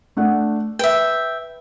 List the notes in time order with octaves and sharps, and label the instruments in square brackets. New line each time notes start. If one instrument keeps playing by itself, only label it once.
[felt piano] A3 D4 F#5
[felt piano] B4 [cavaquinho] E5 G5